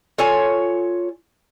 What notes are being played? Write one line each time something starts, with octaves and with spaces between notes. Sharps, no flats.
F4 A4 C#5 G#5